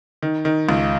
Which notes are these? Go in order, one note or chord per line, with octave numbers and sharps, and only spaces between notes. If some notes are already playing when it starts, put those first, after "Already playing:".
D#3
D#3
C#2